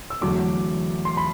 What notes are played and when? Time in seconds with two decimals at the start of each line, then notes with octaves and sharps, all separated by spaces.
0.10 E6
0.21 E2 D3 F#3 A3 D6
1.05 C6
1.17 B5